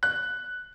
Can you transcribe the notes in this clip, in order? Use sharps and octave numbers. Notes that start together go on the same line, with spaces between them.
F#6